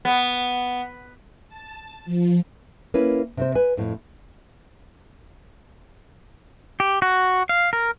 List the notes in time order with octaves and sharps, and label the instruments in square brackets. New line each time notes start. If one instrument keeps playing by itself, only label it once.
[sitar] B3
[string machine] A5
F3
[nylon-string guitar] A#3 C#4 E4 B4
C3 C4 C5
B4 G#5
F2 A2
[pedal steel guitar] G4
F#4
F5
A#4